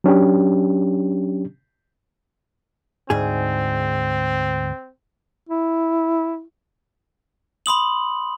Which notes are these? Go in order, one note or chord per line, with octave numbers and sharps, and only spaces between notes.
F#3 C#4 D4 G4
D2 G#2 C4 G#4
E4
B5 C6 D#6 F#7